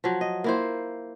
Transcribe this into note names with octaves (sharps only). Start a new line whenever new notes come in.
F3 F#3
D#5
A#3 E4 C5